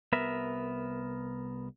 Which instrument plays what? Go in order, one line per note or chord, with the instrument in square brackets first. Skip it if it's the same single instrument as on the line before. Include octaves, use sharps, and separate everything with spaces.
[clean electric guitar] C2 B3 A#4 E5